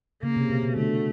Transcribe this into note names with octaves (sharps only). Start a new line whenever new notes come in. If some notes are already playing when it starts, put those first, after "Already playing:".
C#3 A#3
C3
B2
B2
D3 A3